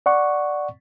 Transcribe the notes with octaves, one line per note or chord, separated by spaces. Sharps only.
D5 F#5 C#6